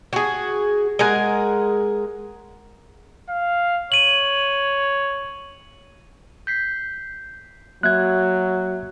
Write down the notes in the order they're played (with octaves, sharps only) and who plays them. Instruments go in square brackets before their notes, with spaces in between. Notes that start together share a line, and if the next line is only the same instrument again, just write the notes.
[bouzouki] F#4 G#4
G#3 A#4 F#5 G#5
[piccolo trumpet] F5
[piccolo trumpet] C#5 [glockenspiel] D#7 F#7
[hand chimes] G6 B6 C7
[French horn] F#3 [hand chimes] A#3 E5 [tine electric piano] F#6 G#6